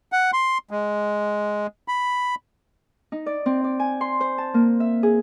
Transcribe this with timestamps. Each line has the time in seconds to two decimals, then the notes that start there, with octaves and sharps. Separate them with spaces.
0.12 F#5
0.33 C6
0.71 G#3
1.88 B5
3.12 D#4
3.26 D5
3.46 C4
3.64 D5
3.79 G#5
4.01 C6
4.20 C5
4.38 A5
4.54 A#3
4.80 E5
5.03 G#4